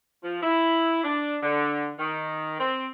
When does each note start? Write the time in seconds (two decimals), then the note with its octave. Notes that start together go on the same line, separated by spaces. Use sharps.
0.22 F3
0.41 E4
1.03 D4
1.42 D3
1.99 D#3
2.59 C4